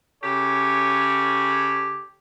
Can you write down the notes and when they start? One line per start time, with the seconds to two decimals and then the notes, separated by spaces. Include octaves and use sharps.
0.23 C#3 G4 A4 C#5